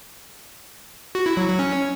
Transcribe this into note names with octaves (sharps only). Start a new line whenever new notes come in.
F#4
E4
F#3
F#3
C#4